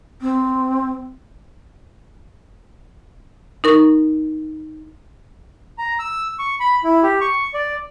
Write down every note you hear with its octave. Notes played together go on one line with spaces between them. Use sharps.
C4
D#4 A#4 C#6
A#5
E6
C#6
B5
E4
G4
C#6
D5